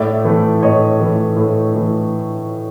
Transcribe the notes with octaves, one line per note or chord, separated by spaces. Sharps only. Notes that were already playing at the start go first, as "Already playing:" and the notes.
Already playing: A2 D5 E5
E3 A3
A2 C#5 D#5
E3 A3
A2
E3 A3